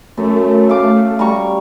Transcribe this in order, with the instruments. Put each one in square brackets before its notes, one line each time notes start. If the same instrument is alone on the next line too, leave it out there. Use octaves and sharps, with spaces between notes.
[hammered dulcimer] F#2 [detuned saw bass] A3
[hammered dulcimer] F5 D6
G3 A#5 C#6